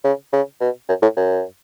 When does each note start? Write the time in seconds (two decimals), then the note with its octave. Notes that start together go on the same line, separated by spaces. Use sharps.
0.04 C#3
0.33 C#3
0.61 B2
0.89 F#2
1.02 A2
1.17 F#2